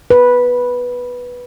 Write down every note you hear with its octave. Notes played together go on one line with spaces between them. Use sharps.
B4